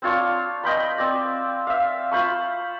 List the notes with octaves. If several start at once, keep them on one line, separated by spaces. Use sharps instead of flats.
C4 D4 F4 C#5
D#5 G5 B5 C6
C4 D5
E5 F5
F4 C5 B5 C#6